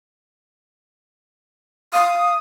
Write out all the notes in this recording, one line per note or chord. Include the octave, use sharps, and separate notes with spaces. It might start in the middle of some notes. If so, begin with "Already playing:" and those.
F5 D#6